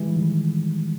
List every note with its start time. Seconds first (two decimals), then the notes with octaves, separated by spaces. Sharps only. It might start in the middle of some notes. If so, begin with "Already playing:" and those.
Already playing: E3 G3 G#3
0.16 D#3